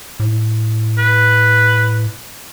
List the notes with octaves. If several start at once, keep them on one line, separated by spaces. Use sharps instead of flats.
A2
B4